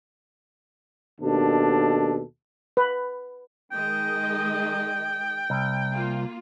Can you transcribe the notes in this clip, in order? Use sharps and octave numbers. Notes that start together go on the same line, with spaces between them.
D#2 B2 D4 A4
B4
D#3 G#3 D#5 G5
C2
A#3 F4